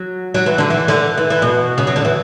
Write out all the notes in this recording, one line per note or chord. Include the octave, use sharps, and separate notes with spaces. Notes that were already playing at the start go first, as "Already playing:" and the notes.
Already playing: F#3
F#3
E3
D3
E3
D3
E3
E3
B2
C#3
F#3
D3
E3